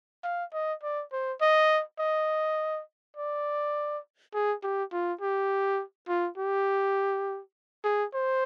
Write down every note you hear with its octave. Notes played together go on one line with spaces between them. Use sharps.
F5
D#5
D5
C5
D#5
D#5
D5
G#4
G4
F4
G4
F4
G4
G#4
C5